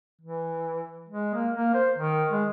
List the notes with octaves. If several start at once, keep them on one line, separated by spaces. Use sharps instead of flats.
E3
G#3
A#3
A#3
C5
D#3
G#3